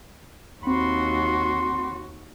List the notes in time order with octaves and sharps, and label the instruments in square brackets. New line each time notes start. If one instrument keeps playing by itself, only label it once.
[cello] D#2 F#4 [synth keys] C4 B5 [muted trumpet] C6